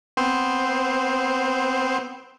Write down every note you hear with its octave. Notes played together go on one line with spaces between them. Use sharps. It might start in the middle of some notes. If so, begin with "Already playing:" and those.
B3 C4 C5